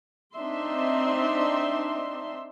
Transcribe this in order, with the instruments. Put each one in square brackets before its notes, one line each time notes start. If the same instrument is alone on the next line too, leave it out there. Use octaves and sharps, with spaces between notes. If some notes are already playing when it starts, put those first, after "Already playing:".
[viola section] C4 D4 D#4 E5 C6